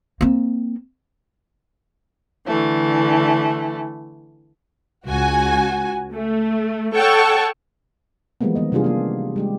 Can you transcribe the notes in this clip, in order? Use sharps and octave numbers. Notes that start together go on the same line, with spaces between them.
A#3 C4
D3 E3 A3
C#2 F#4 G#5
A3
A4 C#5 F#5 G5 A5 C#6
E3 F3 G3 G#3 A#3 B3
D#3 B3 D#5
C3 G3 D4 F4 G#4
A#3 B3 F4
G3 G#3 G4